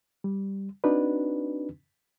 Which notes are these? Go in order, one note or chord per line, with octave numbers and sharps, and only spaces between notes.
G3
C4 D4 D#4 F#4 B4